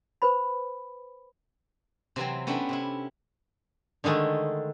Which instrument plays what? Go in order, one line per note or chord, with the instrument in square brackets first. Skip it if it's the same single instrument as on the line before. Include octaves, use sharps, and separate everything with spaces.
[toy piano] B4 C5 B5
[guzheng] C3 E3 F#3 C4
B3 C#4 D4 E4 G4 A4
C3 C#4 E4
[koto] D3 D#3 G#3 A3